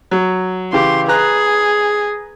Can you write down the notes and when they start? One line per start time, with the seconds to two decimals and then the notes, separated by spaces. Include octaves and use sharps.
0.11 F#3
0.73 C#3 E3 G4 C6
1.08 G#4 B4 A#5 F#6